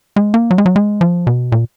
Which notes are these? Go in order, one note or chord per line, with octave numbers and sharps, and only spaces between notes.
G#3
A#3
F#3
G#3
F#3
G#3
F3
B2
A#2